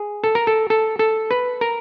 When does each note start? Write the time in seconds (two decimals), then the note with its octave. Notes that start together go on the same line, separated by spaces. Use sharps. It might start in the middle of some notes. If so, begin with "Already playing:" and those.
Already playing: G#4
0.24 A4
0.35 A#4
0.47 A4
0.70 A4
0.99 A4
1.31 B4
1.61 A#4